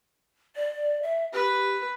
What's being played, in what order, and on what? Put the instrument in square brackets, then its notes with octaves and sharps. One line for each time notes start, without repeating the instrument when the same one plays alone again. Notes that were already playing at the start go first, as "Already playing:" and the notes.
[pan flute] D5
E5
[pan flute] G4 [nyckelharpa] B4